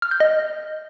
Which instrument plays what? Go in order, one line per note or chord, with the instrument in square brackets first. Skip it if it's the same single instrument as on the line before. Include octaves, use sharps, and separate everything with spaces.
[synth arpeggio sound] F6
G6
D#5